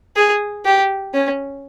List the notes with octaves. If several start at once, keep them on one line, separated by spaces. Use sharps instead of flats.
G#4
G4
C#4